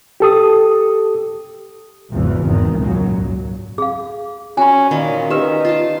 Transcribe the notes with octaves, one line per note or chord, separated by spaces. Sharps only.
G4 A4 D#6
G#1 E2 C#3 E3
E2 G#2 D#3
C#2 F#2 A#2 F#3
G#4 F5
C#4 F#4 G#5 B5
A#2 D#3 C#4
D#4 G4 B4 E5
F4 A5